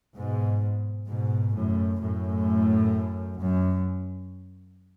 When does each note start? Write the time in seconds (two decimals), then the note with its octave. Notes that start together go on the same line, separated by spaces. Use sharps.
0.16 G#2 B2
1.08 G#2 B2
1.54 F#2 A2
2.00 F#2 A2
3.38 F#2